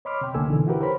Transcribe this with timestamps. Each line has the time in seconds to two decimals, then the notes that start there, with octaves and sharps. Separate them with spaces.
0.05 C#5 D#5 B5 C6 D6 F6
0.21 C3 G5
0.34 C#2 D3 A#3 A4 G#5 E6
0.48 B2 D3 E3 D#4
0.67 E4 F#4 G4 A#4 B4
0.81 A#4 C5 C#5 B5